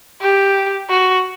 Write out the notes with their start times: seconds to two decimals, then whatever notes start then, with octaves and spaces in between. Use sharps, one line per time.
0.22 G4
0.89 F#4